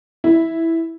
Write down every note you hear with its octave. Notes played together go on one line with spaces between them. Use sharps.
E4